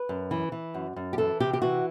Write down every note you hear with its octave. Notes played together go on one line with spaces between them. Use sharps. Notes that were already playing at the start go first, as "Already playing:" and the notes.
Already playing: B4
F#2
E3
E3
F#2
F#2
G4
E3 A4
C3 G4
G4
E3 F#4